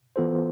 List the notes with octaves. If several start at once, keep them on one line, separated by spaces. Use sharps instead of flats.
E3 B3 F4 A4 C5